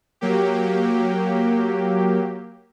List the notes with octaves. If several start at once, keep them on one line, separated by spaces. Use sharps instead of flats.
F#3 A#3 G4